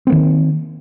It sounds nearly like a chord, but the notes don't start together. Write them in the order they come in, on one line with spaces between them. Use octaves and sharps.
C4 A#3 D#3